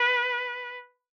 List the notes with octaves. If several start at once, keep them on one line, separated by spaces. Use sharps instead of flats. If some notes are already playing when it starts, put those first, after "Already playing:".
Already playing: B4